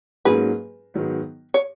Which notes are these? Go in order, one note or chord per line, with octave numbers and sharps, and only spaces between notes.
G#2 F#3 A#3 C#4 G#4 B4
G#2 D#3 F#3 B3
C#5